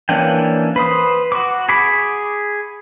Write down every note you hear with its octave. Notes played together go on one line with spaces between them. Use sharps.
E3 A#3 C#4 D4 G5
B4 C5 D#6
F#4 C#6 D6
G#4 B5 C#6 D6